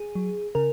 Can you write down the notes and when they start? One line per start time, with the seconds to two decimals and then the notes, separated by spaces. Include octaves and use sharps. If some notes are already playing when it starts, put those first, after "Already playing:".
Already playing: G#4
0.15 F#3
0.55 C#3 A#4